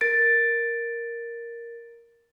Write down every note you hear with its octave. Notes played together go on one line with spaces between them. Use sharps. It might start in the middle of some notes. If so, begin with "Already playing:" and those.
A#4 A6 D7